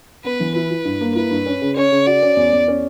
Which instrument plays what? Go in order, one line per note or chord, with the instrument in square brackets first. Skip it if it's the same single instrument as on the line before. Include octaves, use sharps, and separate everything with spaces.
[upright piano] B3 [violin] B4
[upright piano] E3
[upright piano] E4 [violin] B4
[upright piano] E4
G2
A#3
[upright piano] E4 [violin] B4
[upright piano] G2
C#4
C#3
[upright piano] C#4 [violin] C#5
[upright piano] C#3
[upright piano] F#4 [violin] D5
[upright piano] C#4
E2
E2
C#4